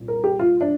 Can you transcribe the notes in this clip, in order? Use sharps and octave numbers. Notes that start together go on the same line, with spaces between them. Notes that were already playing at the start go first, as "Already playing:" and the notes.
Already playing: C2 A#2
A#4
G4
F4
D4